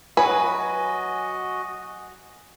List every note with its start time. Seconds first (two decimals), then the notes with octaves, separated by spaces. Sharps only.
0.17 F#3 F#4 B4 D#5 G#5